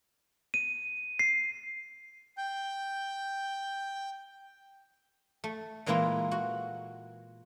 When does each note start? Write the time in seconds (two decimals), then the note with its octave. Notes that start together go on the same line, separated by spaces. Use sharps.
0.54 D#7
1.19 C7
2.38 G5 G6
5.44 A3
5.86 A#2 E3 G#3 A#3 E4 F4
6.31 F#4